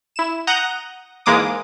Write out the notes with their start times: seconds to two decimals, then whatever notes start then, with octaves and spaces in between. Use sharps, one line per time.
0.16 E4 E7
0.47 F#5 A#5 D#6 G6 A#6
1.26 G#2 E3 G#3 A#3 D6 D#6